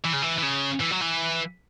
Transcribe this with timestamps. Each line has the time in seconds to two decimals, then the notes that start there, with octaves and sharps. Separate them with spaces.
0.05 E3
0.14 C#3
0.23 E3
0.38 E3
0.43 C#3
0.80 E3
0.91 F#3
1.01 E3